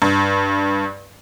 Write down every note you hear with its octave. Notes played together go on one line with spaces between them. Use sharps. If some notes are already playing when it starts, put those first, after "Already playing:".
G2